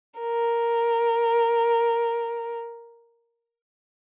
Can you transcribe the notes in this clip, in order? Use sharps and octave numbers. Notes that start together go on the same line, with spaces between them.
A#4